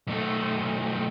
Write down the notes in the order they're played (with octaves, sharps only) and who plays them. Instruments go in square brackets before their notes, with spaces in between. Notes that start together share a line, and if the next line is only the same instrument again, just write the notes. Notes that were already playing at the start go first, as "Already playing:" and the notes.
[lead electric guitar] B1 A3